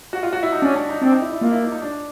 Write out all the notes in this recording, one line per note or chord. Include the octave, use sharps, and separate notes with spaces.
F#4
F4
F#4
E4
D#4
C#4 D4
D4
D#4
C4 D4
D#4
E4
E4
A#3 F4
E4
D#4
D#4
D4